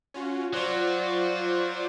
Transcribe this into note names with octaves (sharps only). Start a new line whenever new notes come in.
C#4 F4 F#4
F#3 F4 C5 D5